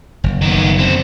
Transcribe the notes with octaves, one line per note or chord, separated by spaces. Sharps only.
F#1
D#3 B3
D3 C4